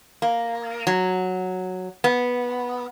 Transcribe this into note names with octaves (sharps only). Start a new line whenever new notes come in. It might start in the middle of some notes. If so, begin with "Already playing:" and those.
A#3
F#3
B3